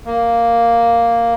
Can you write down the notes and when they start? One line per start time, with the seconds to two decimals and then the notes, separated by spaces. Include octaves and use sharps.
0.06 A#3